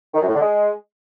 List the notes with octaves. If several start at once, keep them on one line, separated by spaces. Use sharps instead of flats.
D#3
F#2
A2
D3
G#3